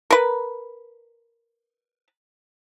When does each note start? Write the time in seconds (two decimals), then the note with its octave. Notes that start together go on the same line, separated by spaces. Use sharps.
0.10 A#4 B4